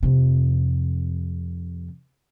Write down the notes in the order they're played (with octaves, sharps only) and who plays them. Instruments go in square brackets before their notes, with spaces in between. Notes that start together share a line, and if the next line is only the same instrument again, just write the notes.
[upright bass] F2 C3